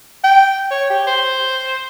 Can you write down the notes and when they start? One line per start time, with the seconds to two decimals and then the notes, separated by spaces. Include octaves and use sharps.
0.24 G5
0.71 C#5
0.90 G4
1.07 C5